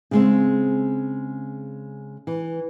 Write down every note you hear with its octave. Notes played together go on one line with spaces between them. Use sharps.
C#3 G#3 C4
E3